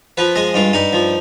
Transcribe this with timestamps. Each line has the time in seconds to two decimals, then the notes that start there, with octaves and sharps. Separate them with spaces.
0.17 F3 B4
0.36 G#3 D#5
0.54 G2 F4
0.73 G2 D#4
0.93 F3